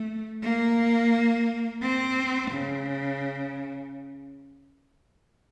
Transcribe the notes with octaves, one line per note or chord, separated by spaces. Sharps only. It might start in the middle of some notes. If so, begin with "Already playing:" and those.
Already playing: A3
A#3
C4
C#3